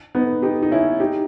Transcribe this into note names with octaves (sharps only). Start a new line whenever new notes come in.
B3 D#4
D#4 G4
D#4
C#4 E4
D#4 G4